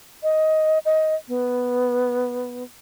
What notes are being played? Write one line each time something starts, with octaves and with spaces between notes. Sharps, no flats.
D#5
D#5
B3